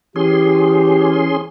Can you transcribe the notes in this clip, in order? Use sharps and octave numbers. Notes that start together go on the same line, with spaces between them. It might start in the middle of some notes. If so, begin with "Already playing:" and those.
E3 C#4 G4 G#4 C6